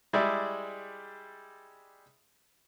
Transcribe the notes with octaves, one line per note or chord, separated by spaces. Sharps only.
G3 G#3 E4 G#4 D5 E5